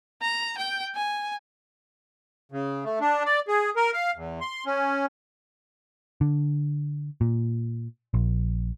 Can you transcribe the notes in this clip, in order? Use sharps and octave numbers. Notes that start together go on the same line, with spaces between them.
A#5
G5
G#5
C#3
A3
D4
D5
G#4
A#4
F5
E2
C6
C#4
D3
A#2
A#1